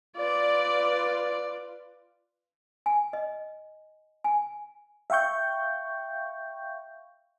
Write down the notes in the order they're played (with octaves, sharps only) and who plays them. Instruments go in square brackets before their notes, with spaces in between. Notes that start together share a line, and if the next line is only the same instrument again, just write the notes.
[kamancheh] F4 B4 [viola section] D5
[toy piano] G#5
D#5
G#5
[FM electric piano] E5 F5 G5 C#6 G6